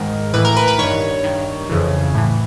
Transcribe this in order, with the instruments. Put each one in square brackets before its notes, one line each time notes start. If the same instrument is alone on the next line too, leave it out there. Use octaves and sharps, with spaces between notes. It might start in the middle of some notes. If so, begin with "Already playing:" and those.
Already playing: [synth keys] G#2 D#3 A#4
A2 E3 B4
A#4
B4
B4
G2 D#3 C#5
G2 D#3
F2 C#3 E3
A2 E3